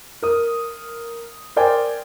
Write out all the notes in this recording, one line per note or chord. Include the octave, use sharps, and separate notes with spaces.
A#4 D#6
A#4 C5 D5 G5 G#5